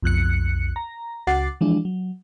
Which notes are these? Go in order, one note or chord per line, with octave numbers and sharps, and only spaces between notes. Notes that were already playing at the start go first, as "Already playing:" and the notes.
B1 F2 F#6 C#7
A#5
C#2 F#4 F#5 D6 A6 C7
E3 F3 G#3 D4
F#3